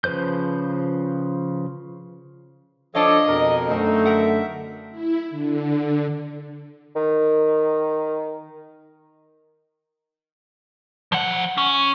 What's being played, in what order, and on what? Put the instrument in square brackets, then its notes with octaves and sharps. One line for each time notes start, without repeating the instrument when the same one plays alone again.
[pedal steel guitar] C#3 F3 B4 C5 G6
[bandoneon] F3 A4 C#5 [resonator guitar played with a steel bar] D4 F5 [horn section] D#5
[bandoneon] F2 B2 A#4
[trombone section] F#2 D3 A3 [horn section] C4 D#4
[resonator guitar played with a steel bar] A#4 F#5 [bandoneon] E5
[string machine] E4
D3
[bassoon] D#3
[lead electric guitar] F3 F#5
C#4